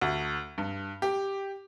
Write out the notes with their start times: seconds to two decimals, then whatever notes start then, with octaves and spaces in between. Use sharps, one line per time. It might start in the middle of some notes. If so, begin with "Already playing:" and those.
0.01 D2
0.58 G2
1.02 G4